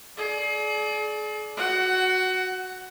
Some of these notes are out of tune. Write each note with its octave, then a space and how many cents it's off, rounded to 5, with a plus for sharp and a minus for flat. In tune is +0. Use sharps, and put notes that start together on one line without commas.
G#4 +40 D5 +0
F#4 +0 F#5 +20